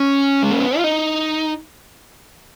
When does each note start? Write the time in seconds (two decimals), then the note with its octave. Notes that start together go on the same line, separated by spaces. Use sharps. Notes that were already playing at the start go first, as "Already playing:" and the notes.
Already playing: C#4
0.43 G#3
0.51 A#3
0.60 B3
0.78 F4
0.84 D#4